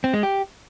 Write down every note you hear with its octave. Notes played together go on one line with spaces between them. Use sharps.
C4
G#3
G4